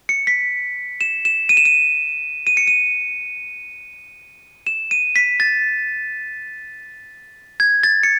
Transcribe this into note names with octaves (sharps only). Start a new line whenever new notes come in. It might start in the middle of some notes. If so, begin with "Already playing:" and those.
C#7
B6
E7
E7
D#7
E7
D#7
D#7
C#7
D#7
E7
D#7
B6
A6
G#6
A6
C#7